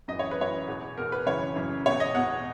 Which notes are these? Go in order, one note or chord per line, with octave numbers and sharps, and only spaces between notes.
F#2 E3 D#5
C#5
B4
F#2 E3 C#5
E2 B2
E2 B2 A#4
B4
F#2 C#3 E3 C#5
F#2 C#3 E3
E2 B2 C#5
D#5
E2 B2 F#5